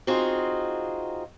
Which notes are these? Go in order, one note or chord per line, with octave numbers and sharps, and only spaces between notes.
C4 D#4 F4 F#4 G#4